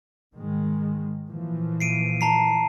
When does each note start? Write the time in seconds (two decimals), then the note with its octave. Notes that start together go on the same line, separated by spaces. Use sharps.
0.34 G#2 D#3 G#3
1.29 A#2 E3 F3
1.80 C7 D7 D#7
2.21 A5 A#5 C7